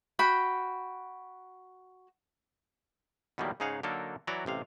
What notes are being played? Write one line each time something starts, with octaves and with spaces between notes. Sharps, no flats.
F#4 G5 B5
E2 B2 D#3 F#3 G3 A#3
G#2 C#3 D#4 G#4 F5 F#5
D3 F#3 A#3 D#4 A4 A#4
E3 F#3 E4 F#4 D5 A#5
A1 C3 F5